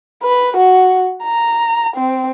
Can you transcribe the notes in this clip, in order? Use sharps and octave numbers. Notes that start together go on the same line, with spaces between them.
B4
F#4
A#5
C4